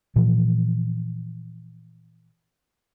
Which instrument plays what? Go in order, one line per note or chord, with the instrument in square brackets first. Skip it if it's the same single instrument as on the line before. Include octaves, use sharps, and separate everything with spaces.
[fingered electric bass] A#2 E3 F3